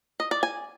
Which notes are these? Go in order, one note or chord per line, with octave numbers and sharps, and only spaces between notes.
D#5
D5
G#5